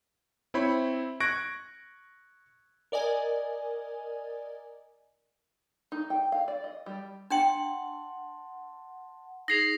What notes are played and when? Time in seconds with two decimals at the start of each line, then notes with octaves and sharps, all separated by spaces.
0.54 C4 E4 C5 C#5 B5
1.20 C#6 F#6 G#6 A#6 D7
2.92 A#4 D5 D#5 G#5
5.92 D#4
6.10 G5
6.32 F5
6.48 D5
6.64 D#5
6.86 G3
7.30 D4 F#5 G5 A5 C6
9.48 D#4 G#4 A#6 C7 F7